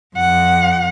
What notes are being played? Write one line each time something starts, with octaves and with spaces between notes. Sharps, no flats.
F2 F#5